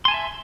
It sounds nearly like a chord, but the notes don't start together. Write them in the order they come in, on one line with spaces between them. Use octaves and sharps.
C6 G#5 A5 E5